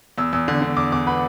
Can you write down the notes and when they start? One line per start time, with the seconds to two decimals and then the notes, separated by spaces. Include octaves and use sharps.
0.18 E2 E6
0.33 E2 E6
0.48 D3
0.62 D3
0.77 E2 D6
0.92 E2 D6
1.07 B3 B5